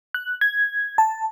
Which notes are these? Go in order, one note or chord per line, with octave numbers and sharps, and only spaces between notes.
F#6
G#6
A5